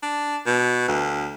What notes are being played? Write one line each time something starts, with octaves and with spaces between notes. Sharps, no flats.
D4
B2
D2